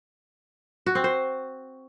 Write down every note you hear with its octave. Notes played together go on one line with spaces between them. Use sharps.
F#4
C4
C5